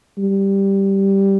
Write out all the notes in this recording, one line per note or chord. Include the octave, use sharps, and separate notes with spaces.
G3